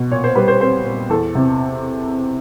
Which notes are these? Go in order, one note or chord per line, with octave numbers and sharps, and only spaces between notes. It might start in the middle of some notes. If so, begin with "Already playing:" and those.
Already playing: B2
A#2 C#5
C5
G3 B4
C5
C4 C5
A#2
E2 A4
C3